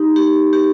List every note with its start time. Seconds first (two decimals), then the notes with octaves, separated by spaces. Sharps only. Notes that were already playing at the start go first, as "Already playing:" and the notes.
Already playing: D#4 G4
0.16 G4
0.53 G4